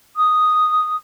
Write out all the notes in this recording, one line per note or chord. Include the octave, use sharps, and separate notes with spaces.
D#6